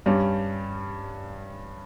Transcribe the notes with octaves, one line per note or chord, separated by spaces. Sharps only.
G2 G3 C#4